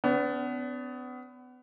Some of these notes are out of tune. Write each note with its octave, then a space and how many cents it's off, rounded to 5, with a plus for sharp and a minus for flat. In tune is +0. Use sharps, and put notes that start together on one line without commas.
B3 +30 D4 -40